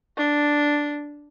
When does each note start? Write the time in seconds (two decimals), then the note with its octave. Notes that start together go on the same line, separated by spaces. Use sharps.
0.17 D4